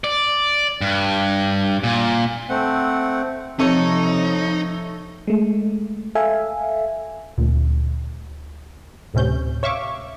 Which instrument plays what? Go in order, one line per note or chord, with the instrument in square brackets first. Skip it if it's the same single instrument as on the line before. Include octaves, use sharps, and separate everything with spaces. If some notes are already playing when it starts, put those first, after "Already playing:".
[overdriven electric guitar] D5
G2
A#2
[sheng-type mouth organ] A3 C4 F#5
[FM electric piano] C3 C#6 C#7 [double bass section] F3 [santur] A3 C#5 [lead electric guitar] D#4
[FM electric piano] G#3 A3
A4 E5 F5 G#5
[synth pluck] D2 A#2
D2 A2 C3 C#4 G6
C#5 E5 F5 C#6 D6